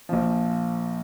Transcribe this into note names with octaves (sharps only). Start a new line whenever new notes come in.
A#1 A#2 F3